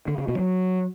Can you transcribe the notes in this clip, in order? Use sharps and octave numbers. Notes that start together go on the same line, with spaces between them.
D3
C#3
B2
F#3